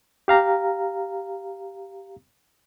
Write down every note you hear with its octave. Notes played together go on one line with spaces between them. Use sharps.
G4 F5 A#5